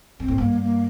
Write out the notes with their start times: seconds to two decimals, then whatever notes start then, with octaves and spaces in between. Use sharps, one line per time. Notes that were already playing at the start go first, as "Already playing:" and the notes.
0.20 G2 C4
0.28 A2
0.38 G2 A#3
0.62 A#3